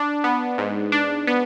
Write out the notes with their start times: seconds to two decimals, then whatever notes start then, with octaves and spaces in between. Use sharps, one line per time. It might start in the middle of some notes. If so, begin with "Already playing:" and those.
Already playing: D4
0.24 B3
0.58 G#2
0.92 D4
1.27 B3